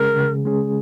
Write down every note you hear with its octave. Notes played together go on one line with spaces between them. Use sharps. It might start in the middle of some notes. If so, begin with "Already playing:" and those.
Already playing: C#3 G#3 C#4 G#4 A#4
C#3
G#3 C#4 G#4